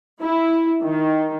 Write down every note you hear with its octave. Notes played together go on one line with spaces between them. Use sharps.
E4
D#3